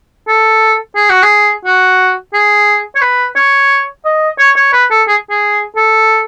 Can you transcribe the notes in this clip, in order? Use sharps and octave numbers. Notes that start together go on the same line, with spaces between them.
A4
G#4
F#4
G#4
F#4
G#4
C#5
B4
C#5
D#5
C#5
C#5
B4
A4
G#4
G#4
A4